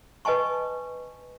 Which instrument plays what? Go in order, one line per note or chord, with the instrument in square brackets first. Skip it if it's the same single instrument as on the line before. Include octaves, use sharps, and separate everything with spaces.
[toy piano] B4 D#5 G#5 A5 C#6